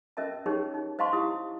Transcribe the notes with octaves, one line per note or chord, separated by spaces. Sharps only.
C#4 A#4 D#5 E5 A5
C#4 D#4 G4 G#4 A#4 C#5
D#4
C5 D#5 F5 A5 C6 C#6
E4 G4 D#6